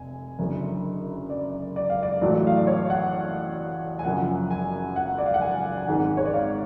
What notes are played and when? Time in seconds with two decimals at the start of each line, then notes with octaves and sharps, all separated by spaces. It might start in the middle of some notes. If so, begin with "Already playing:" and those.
Already playing: F1 G#5
0.39 F#1 F#2 D3
1.30 D5
1.76 D5
1.90 F5
2.03 D5
2.21 A1 A2 F#3 A3 D5
2.47 F5
2.57 D5
2.67 C#5
2.90 F#5
3.99 G#5
4.05 F#1 F#2 F3 F#5
4.51 G#5
4.96 F#5
5.18 D5
5.26 F5
5.34 F#5
5.41 G#5
5.77 G#5
5.87 G#1 G#2 G#3 F#5
6.17 C#5
6.25 D5
6.34 F5